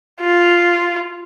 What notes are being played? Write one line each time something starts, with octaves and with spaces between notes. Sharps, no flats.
F4